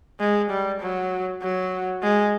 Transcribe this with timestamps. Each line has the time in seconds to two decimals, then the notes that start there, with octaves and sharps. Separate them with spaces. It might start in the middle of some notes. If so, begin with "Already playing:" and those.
0.20 G#3
0.50 G3
0.80 F#3
1.43 F#3
2.03 G#3